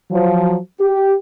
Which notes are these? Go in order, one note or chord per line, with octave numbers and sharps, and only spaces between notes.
F3 F#3
G4